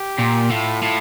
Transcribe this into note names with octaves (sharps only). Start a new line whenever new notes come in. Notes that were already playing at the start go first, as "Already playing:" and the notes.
Already playing: G4
A#2
A2 F4
A2